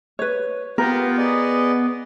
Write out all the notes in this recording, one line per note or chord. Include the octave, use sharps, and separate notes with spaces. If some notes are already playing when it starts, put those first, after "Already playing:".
B4 C#5
B3 F4 G4 A#4 G5
G#4 D5 D#5